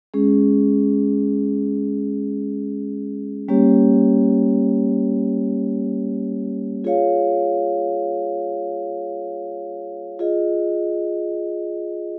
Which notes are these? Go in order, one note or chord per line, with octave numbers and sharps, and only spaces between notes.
G#3 C#4 G#4
G3 A#3 C#4 G4 C#5
F4 G#4 C#5 F5
F4 G#4 D#5